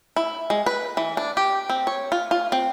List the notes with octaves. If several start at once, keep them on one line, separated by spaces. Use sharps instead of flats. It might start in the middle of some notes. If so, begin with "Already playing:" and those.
E4
G#3
B4
E3
D4
G4
C4
C#5
F4
F4
C4